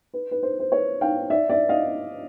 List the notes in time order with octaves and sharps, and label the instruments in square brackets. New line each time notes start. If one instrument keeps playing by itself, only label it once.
[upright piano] B4
B4
C5
C5
B4 C#5
F5 G5
D5 E5
D5 E5
D#5 F5